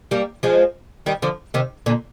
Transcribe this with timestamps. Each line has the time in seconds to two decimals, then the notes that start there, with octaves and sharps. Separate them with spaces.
0.11 G3 A#3
0.43 F3 G#3
1.06 D#3 G3
1.22 D3 F3
1.54 C3 D#3
1.86 A#2 D3